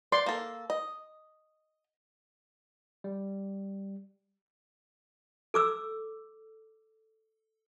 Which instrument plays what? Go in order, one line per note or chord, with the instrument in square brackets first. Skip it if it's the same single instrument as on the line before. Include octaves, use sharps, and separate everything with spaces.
[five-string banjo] D5 [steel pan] C6
[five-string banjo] A#3 A4
D#5
[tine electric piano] G3
[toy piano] A4 D6 E6